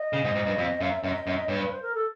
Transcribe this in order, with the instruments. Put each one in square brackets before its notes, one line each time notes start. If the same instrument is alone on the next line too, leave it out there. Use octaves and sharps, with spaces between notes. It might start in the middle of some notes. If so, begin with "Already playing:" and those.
Already playing: [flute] D#5
[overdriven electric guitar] C#3
G#2
G#2
G2
F2
[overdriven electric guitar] F#2 [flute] F5
[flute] E5
[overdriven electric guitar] F#2 [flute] D#5
[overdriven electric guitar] F#2
[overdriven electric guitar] G2 [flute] C#5
[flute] B4
C5
A#4
A4